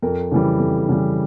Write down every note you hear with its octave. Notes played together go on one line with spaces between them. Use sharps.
F2 A#4
C#3 E3 G3
F2
C#3 E3 G3